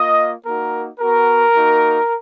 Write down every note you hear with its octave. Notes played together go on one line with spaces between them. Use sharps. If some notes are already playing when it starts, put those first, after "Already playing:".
Already playing: A#3 F4 D#5
A#3 D#4 F#4 A#4
B3 F#4 A#4
A#3 D#4 F#4